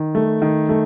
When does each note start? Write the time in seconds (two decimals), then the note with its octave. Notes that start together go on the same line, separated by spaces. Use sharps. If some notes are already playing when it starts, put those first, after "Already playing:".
Already playing: D#3
0.15 A3
0.42 D#3
0.69 A3